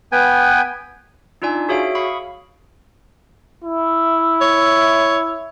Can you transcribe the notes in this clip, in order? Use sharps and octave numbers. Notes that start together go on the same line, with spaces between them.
B3 B4 G5 G#5
D4 D#4 F4 D5 G#5
F#4 G#4 C#5 E5 F5 D7
F5 B5 C#6 D#6
E4
C#5